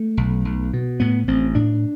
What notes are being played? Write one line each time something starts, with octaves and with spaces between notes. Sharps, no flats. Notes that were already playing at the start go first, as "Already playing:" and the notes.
Already playing: A3
B1
B1
B2
A2 B3
A1 C4
A2 D4